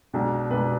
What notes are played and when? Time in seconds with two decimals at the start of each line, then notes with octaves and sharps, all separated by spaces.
0.13 B1 B2 G#3 D4
0.50 B1 B2 G#3 D4 B4